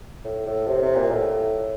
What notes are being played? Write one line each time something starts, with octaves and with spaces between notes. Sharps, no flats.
A2
A2
C3
C3
A#2
A2